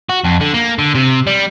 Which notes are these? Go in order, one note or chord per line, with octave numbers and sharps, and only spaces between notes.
F#4
F2
D3
A#3
D3
C3
G3